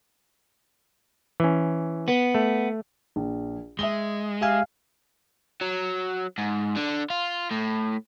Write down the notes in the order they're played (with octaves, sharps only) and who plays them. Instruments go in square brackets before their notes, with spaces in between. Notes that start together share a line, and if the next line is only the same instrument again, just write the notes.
[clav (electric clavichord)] E3 C#4
[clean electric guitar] B3
[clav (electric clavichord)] A3
[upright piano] A#1
[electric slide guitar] G#3 [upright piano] E5 D#6 G7
[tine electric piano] G4 E5 G#5 [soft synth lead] F5
[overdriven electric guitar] F#3
G#2
D3
F4
A2